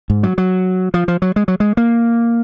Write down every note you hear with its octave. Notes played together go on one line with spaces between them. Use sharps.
G#2
F#3
F#3
F3
F3
F#3
G#3
F#3
G#3
A#3